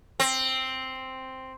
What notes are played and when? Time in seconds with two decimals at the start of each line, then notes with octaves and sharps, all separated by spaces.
0.20 C4